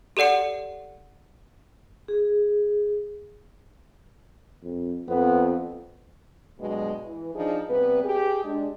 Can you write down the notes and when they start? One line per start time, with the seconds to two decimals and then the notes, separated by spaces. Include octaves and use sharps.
0.17 G4 A4 D5 F#5 C#7
2.08 G#4
4.63 F2
5.08 F2 B3
6.60 G2 B2 F#3 G#3
7.04 E3
7.35 F3 D4 D#4 G#4
7.69 C3 G3 B3 B4
8.04 G4 G#4
8.44 G#3 D4